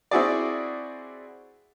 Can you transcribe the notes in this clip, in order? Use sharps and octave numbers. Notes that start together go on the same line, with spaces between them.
C4 E4 F#4 G#4 D5